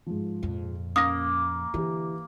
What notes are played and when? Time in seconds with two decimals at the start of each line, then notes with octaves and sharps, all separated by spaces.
0.06 G#2 F3
0.43 F2 A#2
0.96 A#3 C#4 D#6 A#6
1.74 D3 E3 G4